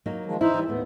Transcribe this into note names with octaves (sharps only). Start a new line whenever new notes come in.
F#3 A#3 D#4
D#3 F3 G#3
E3 D#4 E4 C5 E5
E3 G3
D#2 A2 A3 B3